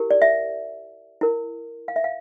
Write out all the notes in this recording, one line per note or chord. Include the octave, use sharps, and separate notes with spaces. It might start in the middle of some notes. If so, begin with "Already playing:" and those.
Already playing: E4 G4 A#4
D5
E5
E4 A#4
F5
E5
F5